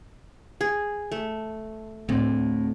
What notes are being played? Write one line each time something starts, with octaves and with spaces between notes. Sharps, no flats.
G#4
A3
D2 A2 C4